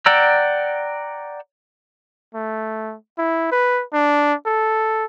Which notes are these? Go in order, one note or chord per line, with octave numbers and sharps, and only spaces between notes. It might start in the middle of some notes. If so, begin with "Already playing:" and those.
D5 F#5 G5 A#5 E6
A3
E4
B4
D4
A4